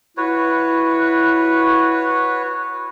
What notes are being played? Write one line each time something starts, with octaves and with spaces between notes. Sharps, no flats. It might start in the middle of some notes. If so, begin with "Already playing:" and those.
E4 F#4 B4 C#5